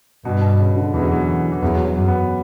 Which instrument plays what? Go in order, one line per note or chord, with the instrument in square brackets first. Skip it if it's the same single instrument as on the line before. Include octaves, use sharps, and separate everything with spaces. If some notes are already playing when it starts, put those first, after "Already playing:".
[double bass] G2 [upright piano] B2
[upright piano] B2
C#3
D3
[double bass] E2 [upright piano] E3
[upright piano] F#3
E3
E3
[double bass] E2 [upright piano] F#3
[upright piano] F#3
[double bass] F#2
[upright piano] B3